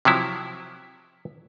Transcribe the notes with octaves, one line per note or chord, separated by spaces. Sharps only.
C3 F3 F#3 E4